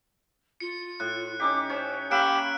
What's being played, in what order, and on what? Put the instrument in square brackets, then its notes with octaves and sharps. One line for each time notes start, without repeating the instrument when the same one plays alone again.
[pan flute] F4 [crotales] C#7
[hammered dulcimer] A2 [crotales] F#6
[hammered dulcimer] C#4 D#4 G4 [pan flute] D6
[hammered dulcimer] C#4 C#5 [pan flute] C5
[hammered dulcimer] A#3 E5 F5 [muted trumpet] G4 [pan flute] B5 [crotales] F#6 D7 E7